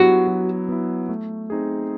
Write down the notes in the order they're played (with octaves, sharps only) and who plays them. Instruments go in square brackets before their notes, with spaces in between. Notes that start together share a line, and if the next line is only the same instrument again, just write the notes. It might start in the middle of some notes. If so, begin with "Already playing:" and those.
Already playing: [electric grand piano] F#3 B3 E4 [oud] F#4
[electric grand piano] F#3
B3 E4
A3
C4 D#4 G#4